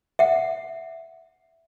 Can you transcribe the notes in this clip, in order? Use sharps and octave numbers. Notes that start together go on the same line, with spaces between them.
E5 F#5